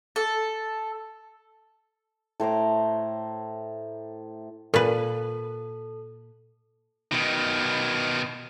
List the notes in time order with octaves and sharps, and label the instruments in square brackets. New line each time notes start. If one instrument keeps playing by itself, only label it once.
[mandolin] A4
[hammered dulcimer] A2 C5 A#5 D6
[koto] A#2 B4 [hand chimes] A4
[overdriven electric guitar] B2 D#3